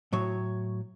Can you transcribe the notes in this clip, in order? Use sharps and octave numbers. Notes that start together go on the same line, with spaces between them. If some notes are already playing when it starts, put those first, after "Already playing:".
A2 F#3 C#5